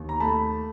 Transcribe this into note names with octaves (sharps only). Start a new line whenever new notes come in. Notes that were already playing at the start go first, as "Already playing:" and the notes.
Already playing: D#2
A#5
A3 A5 B5